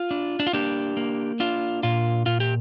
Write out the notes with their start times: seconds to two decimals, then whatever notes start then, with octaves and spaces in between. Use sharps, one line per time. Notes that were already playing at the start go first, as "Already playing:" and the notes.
Already playing: F4
0.11 D4
0.40 D4
0.47 F4
0.53 A#3 D4 G4
0.97 A#3
1.40 D4 F4
1.83 A#2 F4
2.26 A#2 F4
2.40 G4